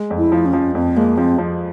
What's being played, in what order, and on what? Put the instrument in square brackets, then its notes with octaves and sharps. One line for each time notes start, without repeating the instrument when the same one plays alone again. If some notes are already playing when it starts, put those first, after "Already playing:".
Already playing: [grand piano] G#3
F2
[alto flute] E4
[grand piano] F3
[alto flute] C#4
[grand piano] F3
[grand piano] F2 [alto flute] C4
[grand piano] G#3 [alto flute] A#3
[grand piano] F3 [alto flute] C4
[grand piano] F3